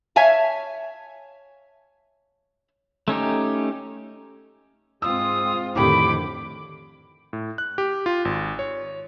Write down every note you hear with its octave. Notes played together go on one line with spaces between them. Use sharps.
C#5 E5 F5 G#5 A5
A3 C#4 D#4 G4
G#2 G#3 C4 F4 D#6 E6
F2 A2 D3 D#3 G4 B5 D6
A2
F#6
G4
F4
G#1
C#5